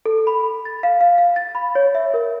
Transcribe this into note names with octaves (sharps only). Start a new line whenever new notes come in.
A4
B5
A6
F5
F5
F5
A6
B5
C#5
E5
A#4